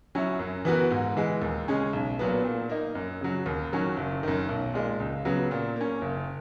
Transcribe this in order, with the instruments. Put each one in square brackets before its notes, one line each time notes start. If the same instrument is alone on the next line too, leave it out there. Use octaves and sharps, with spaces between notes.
[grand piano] F#3 C#4 E4
F#2
E3 B3 F#4 A#4
G#2
E3 G#3
D#2
C#3 G#3 C#4
B1
A#2 F#3 B3
A#2
A#3 D#4
F#2
C#3 F#3
D#2
D#3 F#3 C#4
F#1
F#2 D#3
B1
A#2 G#3
C#2
C#3 F#3 B3
A#2
A#3 C#4
F#1